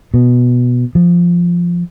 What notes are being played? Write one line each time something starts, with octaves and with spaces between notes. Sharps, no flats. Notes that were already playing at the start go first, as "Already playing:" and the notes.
B2
F3